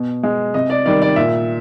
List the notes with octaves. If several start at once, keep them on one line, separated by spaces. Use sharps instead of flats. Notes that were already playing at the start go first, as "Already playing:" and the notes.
Already playing: B2
G#3
C3 D#5
D5
D#3 G3 D5
D5
A#2 E5